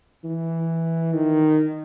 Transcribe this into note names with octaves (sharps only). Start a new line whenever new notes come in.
E3
D#3